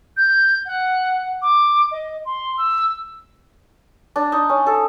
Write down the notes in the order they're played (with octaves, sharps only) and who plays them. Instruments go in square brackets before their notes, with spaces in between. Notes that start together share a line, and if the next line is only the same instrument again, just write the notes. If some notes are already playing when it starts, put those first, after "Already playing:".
[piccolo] G6
F#5
D6
D#5
C6
E6
[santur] D4
D#4
C#4
A4